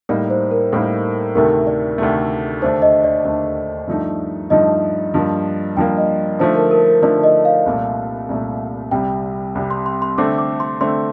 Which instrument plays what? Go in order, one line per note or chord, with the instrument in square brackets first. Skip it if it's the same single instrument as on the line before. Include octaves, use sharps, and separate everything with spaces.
[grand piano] A2 G3 A#3 D#4 [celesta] D5
[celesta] C5
A#4
[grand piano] A2 G3 A#3 D#4 [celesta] A4
[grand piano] D2 C3 D#3 A3 [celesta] A#4
[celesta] D5
[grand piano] D2 C3 D#3 A3
[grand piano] D#2 D3 A3 D4 [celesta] C5
[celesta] D#5
D5
[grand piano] D#2 D3 A3 D4
G2 F3 A3 D#4
[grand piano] G2 F3 A3 D#4 [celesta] D#5
[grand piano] G2 F3 A#3
[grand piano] G2 F3 A#3 [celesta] G5
[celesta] D#5
[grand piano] D3 F3 A3 D#4 [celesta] C5
[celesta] A#4
A#4
A#4
[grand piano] D3 F3 A3 D#4 [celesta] D5
[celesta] D#5
F5
[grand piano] C2 A#2 A3
C2 A#2 A3
[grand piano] C2 C3 G3 [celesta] G5
[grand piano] C2 C3 G3
[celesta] C6
C6
C6
[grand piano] D3 A3 C4 [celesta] D6
[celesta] D6
C6
[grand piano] D3 A3 C4 [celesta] C6